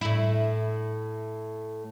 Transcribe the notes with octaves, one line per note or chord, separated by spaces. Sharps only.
A2 E4